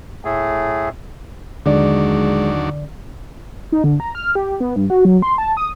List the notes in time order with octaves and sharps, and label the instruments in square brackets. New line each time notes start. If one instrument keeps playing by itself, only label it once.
[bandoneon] A2 A3 G#4
[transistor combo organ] D#2 F#3 D4 [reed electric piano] D3 D5 [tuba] G#3
[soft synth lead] D#4
D3
A#5
F6
G4
B3
G2
F#4
F#3
C6
A5
D#6